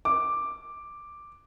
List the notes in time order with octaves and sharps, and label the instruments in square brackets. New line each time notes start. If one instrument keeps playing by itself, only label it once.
[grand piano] D6